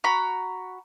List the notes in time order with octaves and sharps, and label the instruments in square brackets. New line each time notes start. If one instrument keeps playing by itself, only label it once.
[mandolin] F#4 A#5 B5